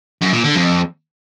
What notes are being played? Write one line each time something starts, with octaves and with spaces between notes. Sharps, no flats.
F#2
A#2
D3
F2